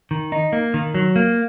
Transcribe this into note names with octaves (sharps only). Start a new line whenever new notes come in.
D#3
D#4
A#3
D#3
F#3
A#3